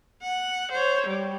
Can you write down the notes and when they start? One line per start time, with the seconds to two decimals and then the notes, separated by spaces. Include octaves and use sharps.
0.22 F#5
0.72 C5 C#5
1.07 G3